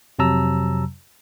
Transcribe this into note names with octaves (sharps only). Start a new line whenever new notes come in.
F2 C3 F#3 A5 A#5 E6